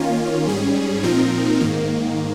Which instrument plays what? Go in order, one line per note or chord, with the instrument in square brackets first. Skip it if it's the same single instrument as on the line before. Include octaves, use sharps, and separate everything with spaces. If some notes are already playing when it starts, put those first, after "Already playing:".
Already playing: [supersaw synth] D#3 A#3 C#4 F4
G#2 G3 C#4 G#4
A#2 F3 C4 D#4 A#4
G#2 D#3 A#3